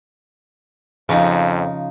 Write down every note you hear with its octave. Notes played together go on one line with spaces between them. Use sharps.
F2 C#3 F3 D#4